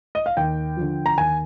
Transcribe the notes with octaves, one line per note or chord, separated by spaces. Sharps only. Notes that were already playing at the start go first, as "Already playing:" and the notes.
D#5
F5
D#2 G5
D3 F3
A#5
D#2 G#5